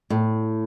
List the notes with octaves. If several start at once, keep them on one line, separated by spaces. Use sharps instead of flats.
A2